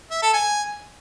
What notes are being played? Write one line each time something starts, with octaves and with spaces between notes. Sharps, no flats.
E5
A4
G#5